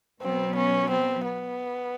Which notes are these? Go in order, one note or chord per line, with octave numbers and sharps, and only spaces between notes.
B2 F#3 B3 C4
C#4
C4
B3